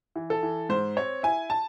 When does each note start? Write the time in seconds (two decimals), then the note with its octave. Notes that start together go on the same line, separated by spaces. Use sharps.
0.16 E3
0.30 A4
0.43 E3
0.69 G#2 C5
0.96 C4 C#5
1.23 E4 G#5
1.50 A5